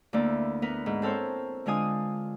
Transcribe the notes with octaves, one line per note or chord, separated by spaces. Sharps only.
D2 A#3 B3 E4 D5
B3 A#4 B4
G#2
C4 A4 A#4 C5 C#5
D3 G#3 D4 F4 G#5 D#6